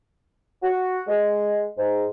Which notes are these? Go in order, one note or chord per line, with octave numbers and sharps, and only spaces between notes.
F#4
G#3
G#2